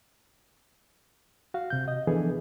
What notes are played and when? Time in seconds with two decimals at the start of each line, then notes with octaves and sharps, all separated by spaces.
1.54 F#4 F5
1.70 C3 G6
1.88 D#5
2.07 E3 F3 B3 D4 G#4 A4